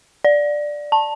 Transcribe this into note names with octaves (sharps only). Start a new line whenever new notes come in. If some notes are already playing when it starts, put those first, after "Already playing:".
D5
A5